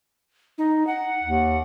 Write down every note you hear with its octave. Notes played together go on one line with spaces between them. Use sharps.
D#4
F#5
D#2